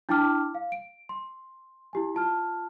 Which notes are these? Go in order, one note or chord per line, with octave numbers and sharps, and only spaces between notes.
D4 E4 G5 A5 D6 F6
F5
D7
C6
E4 G4 G#5
F4 A5 F6